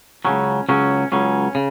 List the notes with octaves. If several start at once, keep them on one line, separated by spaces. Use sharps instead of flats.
C#2 C#3 F#3 C#4
C#2 C#3 F#3 C#4
C#2 C#3 F#3 C#4
C#3